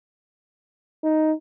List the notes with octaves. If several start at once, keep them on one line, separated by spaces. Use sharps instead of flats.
D#4